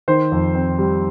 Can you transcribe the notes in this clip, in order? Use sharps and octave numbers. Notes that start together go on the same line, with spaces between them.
D#3 C5
F2
C4
G3